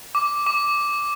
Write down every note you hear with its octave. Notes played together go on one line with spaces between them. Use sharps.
D6
D6